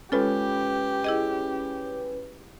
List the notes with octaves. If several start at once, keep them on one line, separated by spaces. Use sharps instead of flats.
G#3 C#4 F4 G4 A4 B4
E4 G#4 D#5